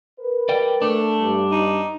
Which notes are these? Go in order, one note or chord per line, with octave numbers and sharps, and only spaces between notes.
A#4 B4
D5 G5
A3 D4
G2 G3
D#4